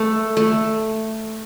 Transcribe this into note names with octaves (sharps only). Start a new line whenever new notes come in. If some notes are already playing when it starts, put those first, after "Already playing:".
Already playing: A3
A3